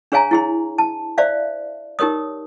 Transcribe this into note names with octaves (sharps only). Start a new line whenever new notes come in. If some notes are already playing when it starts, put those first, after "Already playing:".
D4 G#4 C#5 F5 G#5 A#5
E4 G#4 C6
A5
C5 D5 E5 F5
D#4 G4 A#4 C#5 D#6